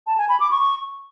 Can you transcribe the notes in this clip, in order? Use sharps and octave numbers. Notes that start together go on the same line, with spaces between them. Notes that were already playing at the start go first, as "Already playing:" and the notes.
A5
G#5
B5
D6
C#6